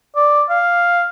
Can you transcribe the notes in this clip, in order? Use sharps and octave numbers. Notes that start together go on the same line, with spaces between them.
D5
F5